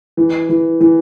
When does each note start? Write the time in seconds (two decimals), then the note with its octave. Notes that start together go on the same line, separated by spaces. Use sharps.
0.17 E3
0.49 E3
0.81 E3